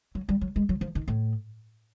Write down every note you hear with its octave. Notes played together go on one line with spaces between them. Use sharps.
F#3
G3
F#3
G#3
F#3
F3
D#3
A2